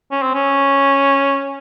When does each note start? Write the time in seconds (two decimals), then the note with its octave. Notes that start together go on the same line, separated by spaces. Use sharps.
0.12 C#4
0.23 C4
0.35 C#4